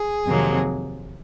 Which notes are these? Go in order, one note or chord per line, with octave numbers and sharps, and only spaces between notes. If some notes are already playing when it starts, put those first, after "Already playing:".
Already playing: G#4
F2 C3 D#3 F#3 A#3